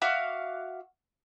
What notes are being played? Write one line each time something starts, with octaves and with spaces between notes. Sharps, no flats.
F#4 E5 F5 D6